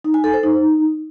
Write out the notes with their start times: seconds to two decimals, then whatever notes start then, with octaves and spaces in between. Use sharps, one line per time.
0.04 D#4
0.14 G#5
0.24 A4
0.34 C5
0.43 D#4